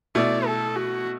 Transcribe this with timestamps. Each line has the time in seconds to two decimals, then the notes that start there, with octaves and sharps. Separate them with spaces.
0.15 B2 A3 E4 D5
0.46 A4
0.76 F#4